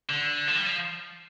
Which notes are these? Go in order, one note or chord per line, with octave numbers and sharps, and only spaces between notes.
D3
F3
G3
F3